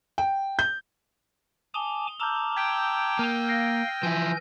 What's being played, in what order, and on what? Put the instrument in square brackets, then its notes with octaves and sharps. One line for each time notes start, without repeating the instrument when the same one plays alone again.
[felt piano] G5
G6
[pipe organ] G#5 A5 D6 [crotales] D#6 G7
[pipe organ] A5 A#5 D6 [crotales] E6 F6 G6
[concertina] G5 [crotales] G#6 B6 D7
[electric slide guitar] A#3 [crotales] F6 D#7
[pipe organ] F5 [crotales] A#6
[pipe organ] E3 G#5 G6 [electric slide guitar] F3 E4